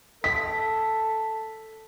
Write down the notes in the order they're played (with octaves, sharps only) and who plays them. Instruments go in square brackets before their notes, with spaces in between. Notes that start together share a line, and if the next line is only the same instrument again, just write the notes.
[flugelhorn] A4 [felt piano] B6